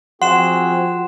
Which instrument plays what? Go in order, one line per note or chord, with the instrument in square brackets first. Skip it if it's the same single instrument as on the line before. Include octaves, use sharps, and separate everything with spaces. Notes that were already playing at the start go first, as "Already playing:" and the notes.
[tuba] F3 [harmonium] C4 F#4 G#4 [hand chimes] F#5 [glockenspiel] C6 E7